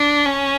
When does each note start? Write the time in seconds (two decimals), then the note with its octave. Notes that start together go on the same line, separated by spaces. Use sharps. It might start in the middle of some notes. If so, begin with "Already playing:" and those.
Already playing: D4
0.25 C#4